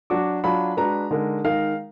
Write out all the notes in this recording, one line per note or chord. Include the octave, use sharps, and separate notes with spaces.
F#3 D4 F#4 D6
F#3 D4 F4 B5
G#3 D4 F#4 B4 A#5
D3 G#3 D#4 A#4
D#3 G#3 D#4 A#4 F5